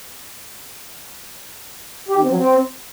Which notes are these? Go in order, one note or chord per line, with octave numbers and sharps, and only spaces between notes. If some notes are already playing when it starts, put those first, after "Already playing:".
G4
D#3
C4
F#3
C4